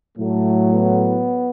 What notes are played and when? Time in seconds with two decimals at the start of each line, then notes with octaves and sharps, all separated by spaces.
0.18 A2 F#3 A3
0.73 B3